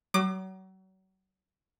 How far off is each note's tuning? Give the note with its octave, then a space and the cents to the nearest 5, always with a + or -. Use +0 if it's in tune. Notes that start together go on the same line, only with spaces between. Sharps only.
F#3 +35 D6 +35